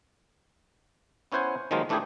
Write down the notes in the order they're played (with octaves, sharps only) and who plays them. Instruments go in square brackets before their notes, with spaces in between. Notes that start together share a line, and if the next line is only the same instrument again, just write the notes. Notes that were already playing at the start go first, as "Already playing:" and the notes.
[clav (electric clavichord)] B3 C#4 E4 C5 F#5 G#5
D#3 F3 F#3 G#3 A#3 F4
E3 A3 D4 E4 G4 G#4